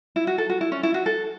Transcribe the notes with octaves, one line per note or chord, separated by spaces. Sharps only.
E4
F#4
A4
F#4
E4
C#4
E4
F#4
A4